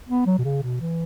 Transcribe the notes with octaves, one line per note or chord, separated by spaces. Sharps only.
B3
F#3
B2
C#3
B2
E3